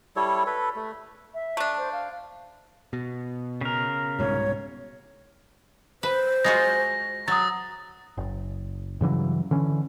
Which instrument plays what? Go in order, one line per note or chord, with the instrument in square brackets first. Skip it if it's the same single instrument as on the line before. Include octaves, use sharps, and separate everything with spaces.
[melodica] G3 E4 A4 C#5
A4 B4
A3
[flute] E5
[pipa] A3 D4
[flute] C5
F5
[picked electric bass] B2
[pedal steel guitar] C#3 A#4
[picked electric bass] C2 G#2 B2 [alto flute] C#5
[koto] B4 [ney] C5
[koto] G#3 F4 F#4 [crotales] A#6
[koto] F#3 [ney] A#5 [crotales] D#6 A6
[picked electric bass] F#1
G2 C#3 E3 F#3
D3 E3 C#4